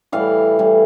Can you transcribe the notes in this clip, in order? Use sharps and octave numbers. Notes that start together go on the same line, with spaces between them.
A2 E3 G3 F5
A2 E3 G3